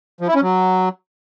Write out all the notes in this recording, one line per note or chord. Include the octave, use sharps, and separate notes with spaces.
F3
E4
C#4
F#3